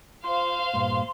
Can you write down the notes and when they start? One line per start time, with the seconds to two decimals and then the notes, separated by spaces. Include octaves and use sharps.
0.24 F4 C5 F5 C6
0.73 G2 A#2 B3